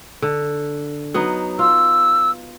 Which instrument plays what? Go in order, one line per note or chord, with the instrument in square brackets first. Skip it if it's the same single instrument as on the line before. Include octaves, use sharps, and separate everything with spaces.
[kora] D3
F#3 B3 D#4
[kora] F4 [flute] E6